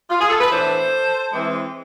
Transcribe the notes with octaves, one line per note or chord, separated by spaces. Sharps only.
F4
G#4
A4
B4
A2 E3 B3 D4 A4 C5
E3 G#3 C4